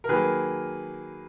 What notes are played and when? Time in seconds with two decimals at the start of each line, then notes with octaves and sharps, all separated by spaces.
0.04 A#4
0.09 D#3 F#3 A#3 G#4 B4